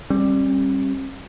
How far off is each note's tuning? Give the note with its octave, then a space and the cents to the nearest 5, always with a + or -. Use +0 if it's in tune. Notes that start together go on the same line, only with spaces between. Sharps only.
G3 +0 C#4 -45